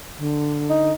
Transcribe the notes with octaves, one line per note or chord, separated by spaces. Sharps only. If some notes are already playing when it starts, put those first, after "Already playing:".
D3
D#4